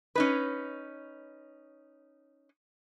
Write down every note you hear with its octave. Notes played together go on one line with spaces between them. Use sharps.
C#4 D#4 B4